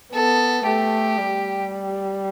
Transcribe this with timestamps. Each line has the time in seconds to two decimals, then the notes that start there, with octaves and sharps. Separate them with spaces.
0.14 B3 A4
0.65 A3 G4
1.18 G3